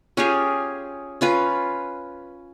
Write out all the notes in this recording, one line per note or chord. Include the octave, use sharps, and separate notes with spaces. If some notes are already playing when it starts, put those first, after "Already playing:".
C#4 F4 G4 G#4
C#4 F4 B4